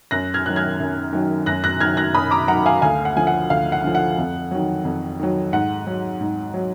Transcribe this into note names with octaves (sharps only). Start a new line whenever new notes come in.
F#2 F#6 A#6
F6 G#6
D#3 F#3 F#6
F6 G#6
F#2
D#3 F#3
F#2 F#6 A#6
F#6 A#6
D#3 F#3 F6 G#6
F#6 A#6
F#2 B5 D#6
A#5 D6
D#3 F#3 F#5 A#5
F5 G#5
D2 F5 G#5
F#5
D3 F3 G#5
F#5
D2 F5
F#5
D3 F3
F#5
F2
D#3 F#3
F2
D#3 F#3
G#2 F#5
F#3
G#2
F#3